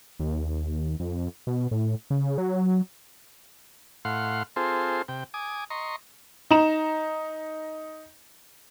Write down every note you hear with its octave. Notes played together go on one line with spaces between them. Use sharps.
D#2
F2
B2
A2
C#3
F#3
A2 F5 F#5 C6
C4 F4 G#4 A4 C5
C3 G5
G#5 D6 D#6
D#5 A#5 C6 C#6
D#4 A#5 E7